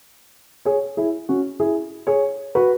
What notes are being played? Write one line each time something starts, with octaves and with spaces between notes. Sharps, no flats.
G#4 C#5
E4 G#4
C#4 F#4
E4 G#4
G#4 C#5
F#4 B4